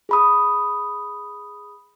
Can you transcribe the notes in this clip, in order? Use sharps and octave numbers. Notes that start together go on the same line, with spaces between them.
G#4 B5 D#6